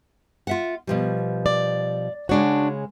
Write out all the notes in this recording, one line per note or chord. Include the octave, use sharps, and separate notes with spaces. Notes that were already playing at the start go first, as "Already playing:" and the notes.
F4 E5 F#5
B2 F3 G3
D5
C#3 G#3 D4 F#4 C#5